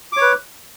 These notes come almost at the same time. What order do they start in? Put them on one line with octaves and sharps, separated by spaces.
D6 C#5 B4